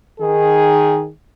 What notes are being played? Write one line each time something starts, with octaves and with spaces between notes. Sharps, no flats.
D#3 G#4